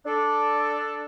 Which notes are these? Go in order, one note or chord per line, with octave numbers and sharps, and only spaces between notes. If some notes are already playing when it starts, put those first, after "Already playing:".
D4 A4